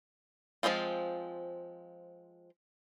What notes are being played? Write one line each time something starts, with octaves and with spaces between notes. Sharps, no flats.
F3 G3 G#3 C4 F4